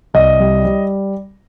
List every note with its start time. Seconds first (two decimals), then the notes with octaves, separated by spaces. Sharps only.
0.14 C2 D#5
0.40 G3
0.65 G3